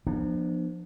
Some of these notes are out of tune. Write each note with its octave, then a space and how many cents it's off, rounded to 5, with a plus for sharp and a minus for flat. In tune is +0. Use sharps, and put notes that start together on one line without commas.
F3 +0 B3 -30 D4 +35